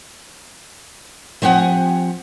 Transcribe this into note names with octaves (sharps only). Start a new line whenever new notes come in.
F3 C4 G4 F#5 G#5